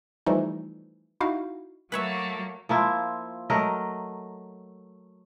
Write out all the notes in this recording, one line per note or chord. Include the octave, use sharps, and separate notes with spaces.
E3 F3 G3 A3 D#4
D#4 E4 F#4 F5
F#3 A3 A#3 B4 C#5 E5
F3 A#3 E4 F4
F#3 A3 A#4 D#5